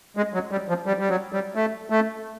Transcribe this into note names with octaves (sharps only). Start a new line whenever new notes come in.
G#3
F#3
G3
F3
G3
G3
F#3
G3
A3
A3